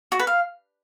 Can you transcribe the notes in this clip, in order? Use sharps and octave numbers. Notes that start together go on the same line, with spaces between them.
F#4
B4
F5